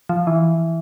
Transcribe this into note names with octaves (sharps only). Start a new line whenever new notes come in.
F3
E3